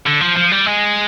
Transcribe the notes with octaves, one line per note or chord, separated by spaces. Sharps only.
D3
F3
F3
G3
G#3